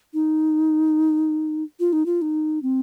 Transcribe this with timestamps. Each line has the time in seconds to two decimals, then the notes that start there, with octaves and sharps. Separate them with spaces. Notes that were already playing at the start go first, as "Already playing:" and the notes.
0.14 D#4
1.80 F4
1.93 D#4
2.06 F4
2.22 D#4
2.63 C4